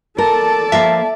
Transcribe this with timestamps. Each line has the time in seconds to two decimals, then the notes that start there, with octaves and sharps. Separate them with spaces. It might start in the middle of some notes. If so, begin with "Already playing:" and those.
0.18 A4 A#4 D5 A5
0.72 F3 A#3 E5 F5